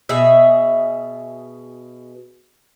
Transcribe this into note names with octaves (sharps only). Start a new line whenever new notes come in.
B2 G#4 E5